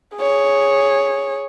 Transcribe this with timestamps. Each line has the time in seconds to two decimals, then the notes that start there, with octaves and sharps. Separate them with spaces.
0.17 G#4 C#5